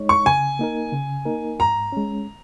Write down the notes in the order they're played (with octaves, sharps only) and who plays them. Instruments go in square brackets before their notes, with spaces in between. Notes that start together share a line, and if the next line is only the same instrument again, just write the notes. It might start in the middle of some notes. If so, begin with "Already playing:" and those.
Already playing: [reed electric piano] G#3 D#4 C#5
[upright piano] C#6
[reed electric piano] C#3 [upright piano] G#5
[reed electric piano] A#3 D#4 A#4
C#3
A#3 D#4 A#4
[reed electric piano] G#2 [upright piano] A#5
[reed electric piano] G#3 C#4